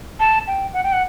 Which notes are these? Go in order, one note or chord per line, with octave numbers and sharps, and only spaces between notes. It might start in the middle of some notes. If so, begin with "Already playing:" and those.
A5
G5
F#5
G5
F#5